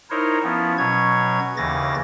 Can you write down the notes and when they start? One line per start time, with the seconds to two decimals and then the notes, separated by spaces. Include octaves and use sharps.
0.10 D#4 E4 A#4 C5 C#5
0.43 F3 B3 C#4 E4
0.78 B2 F#3 C#4 C#5 G#6
1.57 D#2 C#3 E3 A6 A#6